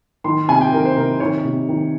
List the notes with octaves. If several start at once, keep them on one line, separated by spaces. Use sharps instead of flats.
D#3 C6
C3 G#5
G5
D#3 A#4
C5
C3 A#4
D#3 C#5
C3
D#3